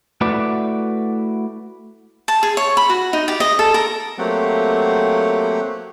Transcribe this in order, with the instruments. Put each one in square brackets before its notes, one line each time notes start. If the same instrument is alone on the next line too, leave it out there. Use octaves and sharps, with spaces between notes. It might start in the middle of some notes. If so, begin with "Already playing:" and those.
[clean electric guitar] A3 E4 F#4 B4 D5
[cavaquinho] A5
G#4
C#5
B5
F#4
D#4
G4
D#5
A4
A#4
[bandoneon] F#3 A3 A#3 C4 G4 F#5